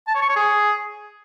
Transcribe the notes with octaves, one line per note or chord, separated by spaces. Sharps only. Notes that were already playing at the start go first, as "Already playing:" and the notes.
A5
C#5
C#6
C#5
G#4